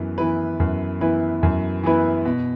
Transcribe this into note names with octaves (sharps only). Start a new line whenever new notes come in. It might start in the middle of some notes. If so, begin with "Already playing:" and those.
Already playing: F#2 E3 B3 B4
E3 B3 E4 B4
F#2
E3 B3 E4 B4
F#2
E3 B3 E4 B4
B2